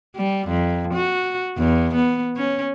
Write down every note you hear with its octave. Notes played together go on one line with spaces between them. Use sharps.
G3
F2
F#4
E2
B3
C#4